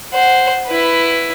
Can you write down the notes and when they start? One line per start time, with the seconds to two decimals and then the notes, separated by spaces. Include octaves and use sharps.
0.13 C5 F#5
0.67 E4 B4